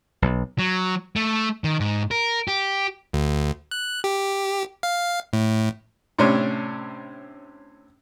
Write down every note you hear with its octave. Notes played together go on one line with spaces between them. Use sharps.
B1
F#3
A3
D#3
G#2
A#4
G4
D2
F#6
G4
F5
A2
A2 C3 C#4 D4